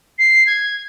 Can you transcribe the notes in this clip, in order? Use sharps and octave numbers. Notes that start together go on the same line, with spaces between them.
C7
G#6